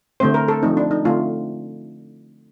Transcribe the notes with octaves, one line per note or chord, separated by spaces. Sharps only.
D3 A3 C4 C5
A#4
A4
F3 A3 C4 D#4
D4
D#4
D3 A3 C4 F4